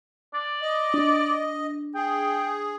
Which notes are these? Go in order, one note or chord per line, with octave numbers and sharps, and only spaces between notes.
D5
D#5
D4
G#4 G5